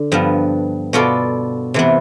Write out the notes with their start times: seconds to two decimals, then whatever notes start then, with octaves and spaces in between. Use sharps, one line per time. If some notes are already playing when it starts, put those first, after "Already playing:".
Already playing: D3
0.12 G2 F3 B3
0.93 B2 B3 F4 A4 D5
1.74 C3 E3 B3